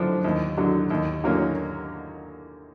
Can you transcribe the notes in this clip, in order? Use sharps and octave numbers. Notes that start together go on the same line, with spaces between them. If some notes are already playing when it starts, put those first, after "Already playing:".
Already playing: F#2 D3 F3 D4
D#2
D3 F#3
D#2
D3 F#3 A#3 C#4